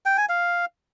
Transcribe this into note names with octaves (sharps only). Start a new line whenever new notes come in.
G5
G#5
F5